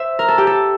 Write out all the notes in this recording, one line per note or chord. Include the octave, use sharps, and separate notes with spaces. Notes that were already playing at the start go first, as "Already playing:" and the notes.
Already playing: C5 E5
A#4
A4
G4
A4